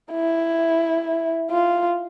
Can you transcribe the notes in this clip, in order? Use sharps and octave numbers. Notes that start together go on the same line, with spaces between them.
E4
F4